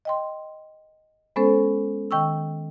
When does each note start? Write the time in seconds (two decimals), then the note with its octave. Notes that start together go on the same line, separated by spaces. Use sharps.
0.05 D#5 G5 C6
1.36 G#3 B3 C#4 A4 C5
2.11 D#3 G5 C#6 E6